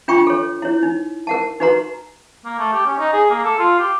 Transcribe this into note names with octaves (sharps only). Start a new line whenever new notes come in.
D4 F4 G5 B5 C#6
A4 C#5
E4 C#5
D#4
A#4 F#5 A5
D#4 F#4 B4 F#5 A#5 C6
A#3
A3
G4
C#4
D#4
G#4
A#3
A4
F4
G4